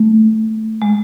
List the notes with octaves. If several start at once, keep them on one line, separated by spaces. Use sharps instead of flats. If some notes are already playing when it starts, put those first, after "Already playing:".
Already playing: A3
G#3